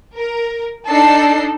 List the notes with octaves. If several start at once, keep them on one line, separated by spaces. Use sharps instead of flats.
A#4
D4 D#4 A4 C7